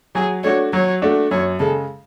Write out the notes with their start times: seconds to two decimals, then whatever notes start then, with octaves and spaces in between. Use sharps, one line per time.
0.15 F#3 G#4
0.44 A3 D4 F#4 C#5
0.73 F#3 C#5
1.02 A3 D4 F#4
1.31 F#2 C#5
1.59 C#3 G#3 A4